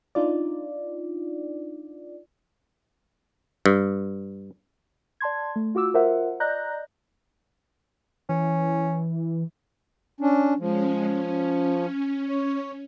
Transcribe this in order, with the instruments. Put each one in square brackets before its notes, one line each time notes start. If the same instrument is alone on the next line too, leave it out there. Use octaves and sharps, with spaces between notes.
[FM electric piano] D4 D#4 F4 D5
[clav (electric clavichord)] G2
[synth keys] D5 A5 C6 G#6
A3
F4 F#4 D6 E6
F4 A#4 C5 E5 F#5
D5 D#5 A#5 F#6 G6 A#6
[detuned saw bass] E3 [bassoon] C#4
[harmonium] C#4 D4
[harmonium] F3 [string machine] G#3 C#4
[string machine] C#4
[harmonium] C#5